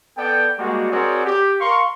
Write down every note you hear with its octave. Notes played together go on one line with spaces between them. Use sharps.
B3 A4 D5 G5
G3 G#3 A#3 F#4
C4 F#4 G#4 A#4 C#5 D5
G4
A#4 F5 C6 C#6